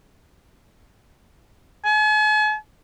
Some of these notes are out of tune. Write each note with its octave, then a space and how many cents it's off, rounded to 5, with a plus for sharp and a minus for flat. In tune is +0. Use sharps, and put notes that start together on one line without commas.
G#5 +45